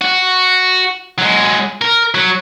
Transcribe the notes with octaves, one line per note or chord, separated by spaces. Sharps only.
F#4
F#3 G#3
A#4
F#3